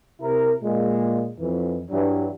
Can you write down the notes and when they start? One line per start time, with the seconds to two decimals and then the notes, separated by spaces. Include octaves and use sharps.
0.20 C3 E4 A#4
0.61 A#2 G#3
1.39 F2 E3
1.90 G2 E3 F#3 G3 D4